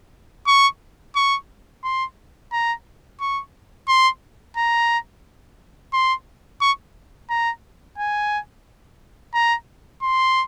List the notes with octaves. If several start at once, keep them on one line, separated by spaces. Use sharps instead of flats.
C#6
C#6
C6
A#5
C#6
C6
A#5
C6
C#6
A#5
G#5
A#5
C6